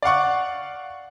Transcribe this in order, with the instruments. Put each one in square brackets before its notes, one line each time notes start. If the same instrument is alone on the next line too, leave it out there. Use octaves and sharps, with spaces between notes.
[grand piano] D5 F5 F#5 C#6